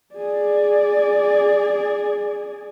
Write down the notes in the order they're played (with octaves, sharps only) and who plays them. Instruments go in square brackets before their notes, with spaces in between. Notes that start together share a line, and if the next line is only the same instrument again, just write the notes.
[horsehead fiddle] G#4 D5